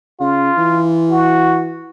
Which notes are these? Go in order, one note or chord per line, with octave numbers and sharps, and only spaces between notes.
C#3 F4
E3
F#4